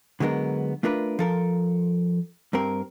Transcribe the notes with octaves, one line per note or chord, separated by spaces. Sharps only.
D3 F#3 G#3 B3 A#4
A3 D4 F4 A#4 B4
F3 A4 A#4
G2 C4 A#4